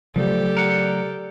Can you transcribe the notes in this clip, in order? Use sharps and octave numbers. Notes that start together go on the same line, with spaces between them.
C#3 F3 F#3 A3 G4 A4 D5
A#4 F#5